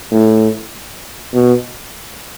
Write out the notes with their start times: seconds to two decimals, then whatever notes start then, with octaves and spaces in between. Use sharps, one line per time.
0.12 A2
1.34 B2